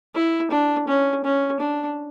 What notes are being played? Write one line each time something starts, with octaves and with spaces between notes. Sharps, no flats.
E4
D4
C#4
C#4
D4